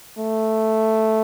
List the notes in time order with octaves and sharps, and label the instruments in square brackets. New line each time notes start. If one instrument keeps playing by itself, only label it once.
[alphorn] A3